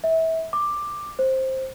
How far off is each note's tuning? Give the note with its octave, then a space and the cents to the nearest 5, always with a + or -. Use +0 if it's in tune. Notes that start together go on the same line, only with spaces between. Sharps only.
E5 -30
D6 +10
C5 +10